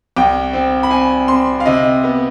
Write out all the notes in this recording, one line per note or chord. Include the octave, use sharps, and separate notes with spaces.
C2 G5
C4
B5
C4 G#5
C4 C6
F5
C3 D#5
B3